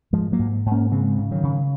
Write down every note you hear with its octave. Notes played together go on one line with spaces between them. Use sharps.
G#2 F3 G#3
F#3 A#3
G#2
G#2
A#3 C#4
C#3 G#3 C4
C#3
D#3 F#3
C#3